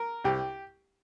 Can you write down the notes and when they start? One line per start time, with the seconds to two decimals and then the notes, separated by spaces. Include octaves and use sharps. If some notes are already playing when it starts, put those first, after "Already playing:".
Already playing: A#4
0.25 C2 G4